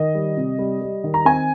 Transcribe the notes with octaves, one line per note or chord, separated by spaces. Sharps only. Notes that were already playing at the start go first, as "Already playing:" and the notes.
Already playing: D#3 D#5
G3
C3
G3
G3
D#3
A#5
C4 G#5